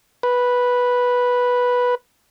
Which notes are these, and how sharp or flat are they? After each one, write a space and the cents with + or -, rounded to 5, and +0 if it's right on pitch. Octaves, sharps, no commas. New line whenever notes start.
B4 -5